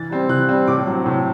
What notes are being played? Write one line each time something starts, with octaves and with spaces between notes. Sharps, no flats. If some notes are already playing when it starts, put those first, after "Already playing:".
Already playing: E3 A6
G3 C4
E3 F#6
G3 C4
A2 D6
F#3 C4
A2